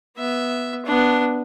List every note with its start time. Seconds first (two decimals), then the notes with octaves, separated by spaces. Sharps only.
0.17 B3 E5
0.85 B3 D4